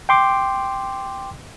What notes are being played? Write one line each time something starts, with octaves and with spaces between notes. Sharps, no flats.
G5 C6 D6